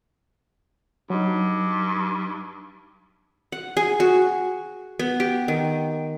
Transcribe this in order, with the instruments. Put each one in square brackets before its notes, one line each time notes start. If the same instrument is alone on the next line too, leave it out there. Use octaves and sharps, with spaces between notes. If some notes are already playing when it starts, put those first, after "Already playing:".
[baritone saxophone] G2 [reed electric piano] F#3 D#4
[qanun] F#5
G#4
F#4
B3
G4
D#3